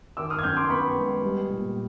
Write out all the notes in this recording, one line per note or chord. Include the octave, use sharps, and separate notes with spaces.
D#3 D6 E6
D#6 F6
G#6
F#2 F6 G6
C6 D6
B3 B5 C#6
G#3
G3
A#2